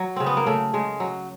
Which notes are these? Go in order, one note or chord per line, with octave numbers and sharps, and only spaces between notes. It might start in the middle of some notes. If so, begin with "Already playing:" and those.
Already playing: F#3
C#3 C4
B3
A#3
C#3 A3
C#3 G#3
F#3